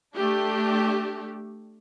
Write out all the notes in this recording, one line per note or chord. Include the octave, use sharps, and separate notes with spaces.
A3 D4 G4